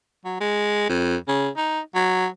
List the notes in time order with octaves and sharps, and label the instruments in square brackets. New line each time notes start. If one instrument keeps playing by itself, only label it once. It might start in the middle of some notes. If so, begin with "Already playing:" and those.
[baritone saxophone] F#3
G#3
F2
C#3
D#4
F#3